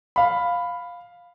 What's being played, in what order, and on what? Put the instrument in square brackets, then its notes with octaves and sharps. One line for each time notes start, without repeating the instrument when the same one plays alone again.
[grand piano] F5 B5